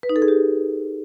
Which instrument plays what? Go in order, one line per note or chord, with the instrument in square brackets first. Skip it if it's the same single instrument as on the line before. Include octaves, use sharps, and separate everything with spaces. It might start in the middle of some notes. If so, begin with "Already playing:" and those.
[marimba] B4
D#4
A4
G#4
G4